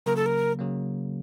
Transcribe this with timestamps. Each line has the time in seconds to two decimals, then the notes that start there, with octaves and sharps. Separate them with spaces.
0.06 C#3 F#3 A#3 A#4
0.16 A4
0.26 A#4
0.59 C#3 F#3 A#3